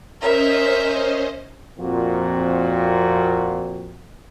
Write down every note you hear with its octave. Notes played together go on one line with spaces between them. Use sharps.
C#4 A#4 C5 D#5 E5
F2 A#2 C4 F#4